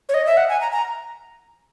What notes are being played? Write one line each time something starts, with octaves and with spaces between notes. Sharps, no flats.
C#5
D#5
E5
F#5
G#5
A#5
A#5